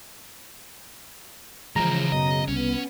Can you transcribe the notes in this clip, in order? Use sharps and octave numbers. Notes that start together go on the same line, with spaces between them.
C#3 E3 F3 G#3 F4 A#5
F#2 B2 D#5
C2 B3 C#4